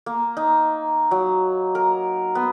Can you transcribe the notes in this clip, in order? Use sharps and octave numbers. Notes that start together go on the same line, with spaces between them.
A#3
D#4
F#3
A#4
B3